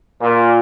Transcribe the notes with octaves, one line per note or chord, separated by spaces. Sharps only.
A#2